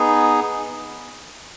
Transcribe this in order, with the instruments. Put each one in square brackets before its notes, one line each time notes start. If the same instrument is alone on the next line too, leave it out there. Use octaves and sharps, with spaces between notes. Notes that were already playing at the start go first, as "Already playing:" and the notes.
Already playing: [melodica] B3 D#4 G#4